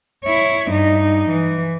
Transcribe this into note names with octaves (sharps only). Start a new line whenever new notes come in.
E4 C#5
G2 D#4
E3